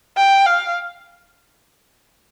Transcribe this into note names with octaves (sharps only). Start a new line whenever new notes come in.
G5
F5